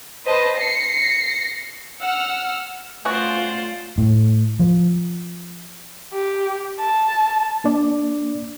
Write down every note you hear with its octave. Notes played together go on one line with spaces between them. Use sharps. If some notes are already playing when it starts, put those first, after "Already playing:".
B4 C5 D#5 A5
A#6 C7 C#7
F#5 E6 F6
A3 B3 C#4 F4 F#4 C5 D5
A2
F3
G4
A5
A#3 D4 D5